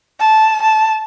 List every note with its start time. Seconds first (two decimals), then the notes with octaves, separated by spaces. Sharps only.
0.20 A5
0.62 A5